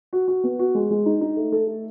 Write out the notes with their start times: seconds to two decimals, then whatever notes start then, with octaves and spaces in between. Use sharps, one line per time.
0.13 F#4
0.28 F#4
0.44 B3
0.59 F#4
0.75 G#3
0.90 G#3
1.06 D#4
1.21 D#4
1.37 A3
1.52 A4
1.67 A3